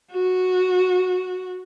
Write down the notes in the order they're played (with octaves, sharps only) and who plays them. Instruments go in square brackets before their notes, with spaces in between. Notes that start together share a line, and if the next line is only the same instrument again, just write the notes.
[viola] F#4